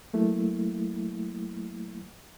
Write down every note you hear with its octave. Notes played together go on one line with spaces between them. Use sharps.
F#3 A3 A#3 E4